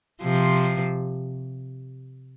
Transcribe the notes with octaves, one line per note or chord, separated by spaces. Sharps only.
C3 F3